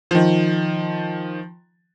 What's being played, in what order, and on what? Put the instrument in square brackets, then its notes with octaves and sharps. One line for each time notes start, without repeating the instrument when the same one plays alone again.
[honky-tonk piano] D#3 F3